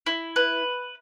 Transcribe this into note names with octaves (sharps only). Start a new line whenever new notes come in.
E4
B4